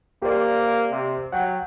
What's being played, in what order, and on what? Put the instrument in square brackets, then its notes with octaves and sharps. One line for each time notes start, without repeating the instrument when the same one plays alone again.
[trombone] A#3 [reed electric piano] G4 C5 D5
[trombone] C3
[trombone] F#3 [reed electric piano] F#5 G5